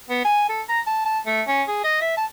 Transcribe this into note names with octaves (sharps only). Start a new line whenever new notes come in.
B3
G#5
A4
A#5
A5
A5
A3
C#4
G#4
D#5
E5
A5